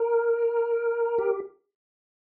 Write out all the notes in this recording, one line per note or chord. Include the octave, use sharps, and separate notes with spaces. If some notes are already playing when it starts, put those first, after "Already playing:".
Already playing: A#4
G4